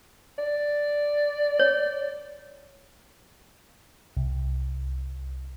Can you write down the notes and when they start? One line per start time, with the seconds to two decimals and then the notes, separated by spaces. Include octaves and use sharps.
0.38 D5
1.59 C#5
4.17 C2